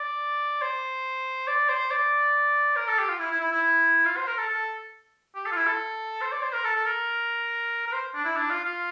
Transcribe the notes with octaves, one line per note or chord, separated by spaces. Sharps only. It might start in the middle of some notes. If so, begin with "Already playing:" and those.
Already playing: D5
C5
D5
C5
D5
A#4
A4
G4
F4
E4
E4
E4
E4
F4
C5
A#4
A4
A4
G4
A4
F4
E4
A4
C5
D5
C5
A#4
A4
A4
A#4
A#4
C5
D4
E4
D4
F4
F4